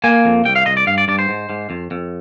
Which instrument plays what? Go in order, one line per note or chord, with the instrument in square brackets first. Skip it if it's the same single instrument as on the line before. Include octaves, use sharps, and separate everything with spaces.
[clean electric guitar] A#3 G#5
F2
C2 G5
F5
C2 D#5
D5
G2 F5
D5
G2 D5
C5
G#2
G#2
F2
F2